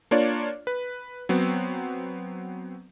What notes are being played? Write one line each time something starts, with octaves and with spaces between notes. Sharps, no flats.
A#3 D4 F4 C#5 D5
B4
F#3 B3 C4